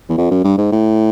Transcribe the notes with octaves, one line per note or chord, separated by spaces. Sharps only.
E2
F2
F#2
G2
G#2
A2